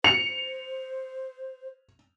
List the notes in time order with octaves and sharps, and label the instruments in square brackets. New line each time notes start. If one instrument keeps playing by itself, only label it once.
[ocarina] C5 [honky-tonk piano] C#7 [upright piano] F7